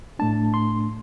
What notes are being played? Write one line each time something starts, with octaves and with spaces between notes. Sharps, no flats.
A2 A3 D4 A5
C6